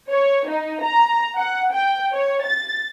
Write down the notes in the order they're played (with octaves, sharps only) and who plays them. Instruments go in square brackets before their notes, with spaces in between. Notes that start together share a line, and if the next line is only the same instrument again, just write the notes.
[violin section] C#5
D#4
A#5
F#5
G5
C#5
A6